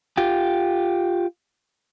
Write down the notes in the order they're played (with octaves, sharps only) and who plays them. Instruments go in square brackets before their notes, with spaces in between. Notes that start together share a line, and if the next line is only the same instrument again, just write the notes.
[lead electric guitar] F4 G4